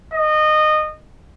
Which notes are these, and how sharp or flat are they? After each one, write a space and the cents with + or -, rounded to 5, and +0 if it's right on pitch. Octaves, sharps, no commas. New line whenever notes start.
D#5 -20